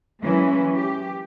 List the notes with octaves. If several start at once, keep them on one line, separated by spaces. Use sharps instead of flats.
E3 F#3 G#3 A#3 C#4 E4
G4